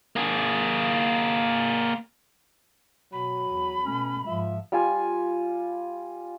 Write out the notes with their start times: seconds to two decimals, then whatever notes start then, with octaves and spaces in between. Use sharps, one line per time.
0.16 A#3 G#4
3.13 B2 F#3 B5
3.50 E2
3.85 B2 A3 C#4
4.27 G#2 F3 F4 E5
4.72 G3 F4 G#5